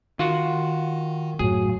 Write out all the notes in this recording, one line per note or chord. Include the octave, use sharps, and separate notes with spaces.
D#3 F4 F#4 F#5
F#2 A2 F#3 G#4